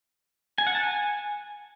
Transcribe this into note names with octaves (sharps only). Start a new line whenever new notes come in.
G#5
F#5
A5
G#5